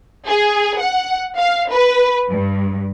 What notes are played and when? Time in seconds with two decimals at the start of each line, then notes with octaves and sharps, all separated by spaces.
0.26 G#4
0.79 F#5
1.37 F5
1.71 B4
2.30 G2